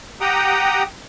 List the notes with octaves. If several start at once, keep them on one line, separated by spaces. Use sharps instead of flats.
G4 F#5 G5 A#5 D#6